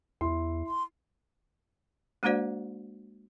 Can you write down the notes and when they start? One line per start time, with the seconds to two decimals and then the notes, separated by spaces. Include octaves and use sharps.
0.21 E2 E4 C6
0.67 C6
2.23 G#3 A#3 D4 F#4 C5 D5